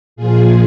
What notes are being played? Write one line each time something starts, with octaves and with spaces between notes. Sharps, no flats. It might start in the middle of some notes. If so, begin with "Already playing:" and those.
A#2 F3 F4 G#4